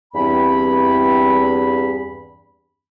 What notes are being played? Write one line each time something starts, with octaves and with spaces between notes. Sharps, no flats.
E2 G2 C4 B5